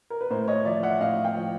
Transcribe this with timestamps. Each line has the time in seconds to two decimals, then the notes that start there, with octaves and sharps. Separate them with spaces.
0.10 A#4
0.21 B4
0.30 A2 A#4 C5
0.48 C#5 D#5
0.65 F3 D5 E5
0.83 E5 F#5
1.01 A2 D#5 F5
1.24 F5 G5
1.36 F3